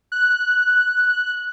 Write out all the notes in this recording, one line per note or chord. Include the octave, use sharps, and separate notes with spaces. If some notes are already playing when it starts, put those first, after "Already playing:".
F#6